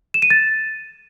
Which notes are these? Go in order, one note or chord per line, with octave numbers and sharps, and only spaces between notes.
E7
D#7
A6